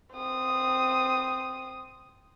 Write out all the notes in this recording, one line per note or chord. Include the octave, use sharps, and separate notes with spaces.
C4 D#6